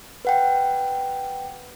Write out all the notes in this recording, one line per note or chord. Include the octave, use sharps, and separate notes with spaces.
B4 F#5 G5